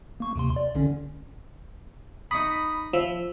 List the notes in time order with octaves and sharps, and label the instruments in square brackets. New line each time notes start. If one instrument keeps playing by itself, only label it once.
[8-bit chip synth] A#3 C#6
D#2 C3 C6
D5
B1 D3 C#4
[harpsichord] D#4 C#6 D#6 [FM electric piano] B5
[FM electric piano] F3 [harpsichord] E5